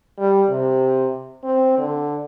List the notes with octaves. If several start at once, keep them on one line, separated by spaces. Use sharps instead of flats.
G3
C3
C4
D3